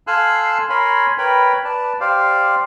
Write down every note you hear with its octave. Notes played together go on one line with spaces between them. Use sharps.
A4 F5 G#5 C6 E6 F#6
A#4 C#5 G#5 B5 C6
A#4 B4 C#5 G5 B5
B4 D5 A5
G4 C5 D5 F5